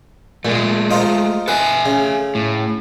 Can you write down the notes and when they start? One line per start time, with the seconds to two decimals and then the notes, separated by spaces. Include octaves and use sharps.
0.45 A#2 G#3 A3
0.91 D#4 F4 C5
1.48 A4 B4 E5 G#5
1.86 C#3
2.35 A2